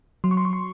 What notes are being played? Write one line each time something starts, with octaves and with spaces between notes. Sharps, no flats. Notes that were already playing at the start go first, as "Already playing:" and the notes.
F#3 C6
C#6
C6
C#6
C6